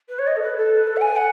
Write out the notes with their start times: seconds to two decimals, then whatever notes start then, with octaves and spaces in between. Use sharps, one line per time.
0.08 B4
0.18 C#5
0.27 D#5
0.36 A4
0.42 B4
0.57 A4
0.76 B4
0.87 A4
0.96 F#5
1.01 G#5
1.16 F#5